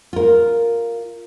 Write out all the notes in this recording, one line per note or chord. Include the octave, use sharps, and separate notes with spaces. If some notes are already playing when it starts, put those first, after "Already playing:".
F4 A#4